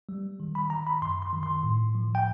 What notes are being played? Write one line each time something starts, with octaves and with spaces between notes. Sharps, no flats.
G3
D#3
B5
D#3 A#5
B5
F#2 C6
C6
D#3
C6
A2
F3
G5